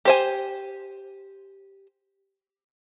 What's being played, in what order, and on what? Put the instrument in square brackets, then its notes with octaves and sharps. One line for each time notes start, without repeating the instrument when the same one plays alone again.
[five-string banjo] G4 C5 G#5